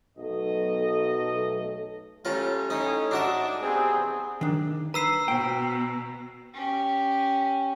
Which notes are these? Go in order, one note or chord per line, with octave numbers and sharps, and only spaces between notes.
B1 A3 A4 D#5
G3 A3 C#4 F4 A#4
A2 C#4 D#4
G#2 D4 D#4 F#4 E5
C3 B3 C4 G#4
D#3 D4
B4 A#5 E6 C7
B2 C5 G5
C#4 G4